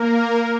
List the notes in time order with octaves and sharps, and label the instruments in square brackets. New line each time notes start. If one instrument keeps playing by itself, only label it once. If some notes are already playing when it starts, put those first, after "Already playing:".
Already playing: [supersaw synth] A#3 A#4